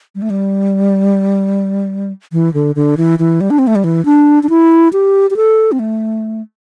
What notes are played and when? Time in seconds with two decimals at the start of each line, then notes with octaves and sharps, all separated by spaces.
0.15 G3
0.22 A3
0.30 G3
2.33 E3
2.54 D3
2.75 D3
2.97 E3
3.19 E3
3.41 G3
3.50 D4
3.59 C4
3.67 A3
3.75 G3
3.84 E3
4.05 D4
4.43 D4
4.49 E4
4.93 G4
5.30 G4
5.36 A4
5.72 C4
5.79 A3